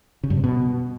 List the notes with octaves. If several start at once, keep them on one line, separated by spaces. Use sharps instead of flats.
C#3
G2
C3
B2